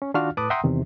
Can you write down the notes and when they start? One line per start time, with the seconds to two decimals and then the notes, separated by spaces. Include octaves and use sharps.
0.02 C#4
0.14 D#3 D4 F4 F#4 F5 F6
0.37 A2 B4 A5 D6 D#6 F#6
0.50 E5 F#5 G5 A#5 C6 D#6
0.63 E2 C3 D#3